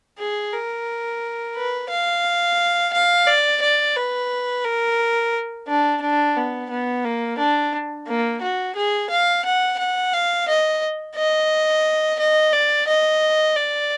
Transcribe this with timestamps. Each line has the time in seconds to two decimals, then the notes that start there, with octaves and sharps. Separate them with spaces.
0.19 G#4
0.53 A#4
1.56 B4
1.90 F5
2.93 F5
3.27 D5
3.62 D5
3.96 B4
4.64 A#4
5.67 D4
6.01 D4
6.36 B3
6.70 B3
7.04 A#3
7.38 D4
8.07 A#3
8.42 F#4
8.76 G#4
9.10 F5
9.45 F#5
9.79 F#5
10.13 F5
10.48 D#5
11.16 D#5
12.19 D#5
12.53 D5
12.87 D#5
13.56 D5